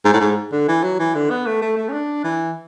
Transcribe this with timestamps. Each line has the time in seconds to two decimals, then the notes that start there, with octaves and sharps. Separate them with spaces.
0.05 G#2
0.13 A2
0.20 G#2
0.52 D3
0.68 E3
0.84 F#3
0.99 E3
1.15 D3
1.31 B3
1.46 A3
1.62 A3
1.77 A3
1.89 C#4
1.93 D4
2.24 E3